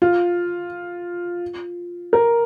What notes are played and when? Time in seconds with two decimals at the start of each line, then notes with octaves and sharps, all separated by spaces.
0.02 F4
2.13 A#4